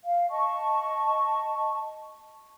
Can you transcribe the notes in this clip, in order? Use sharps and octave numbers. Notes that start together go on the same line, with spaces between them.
F5
D#5 A5 C#6